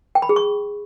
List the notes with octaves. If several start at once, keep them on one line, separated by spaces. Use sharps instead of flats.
G5
B5
G#4
C#6